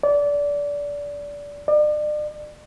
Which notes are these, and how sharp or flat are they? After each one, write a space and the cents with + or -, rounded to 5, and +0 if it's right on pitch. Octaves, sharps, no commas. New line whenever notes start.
D5 -20
D5 +40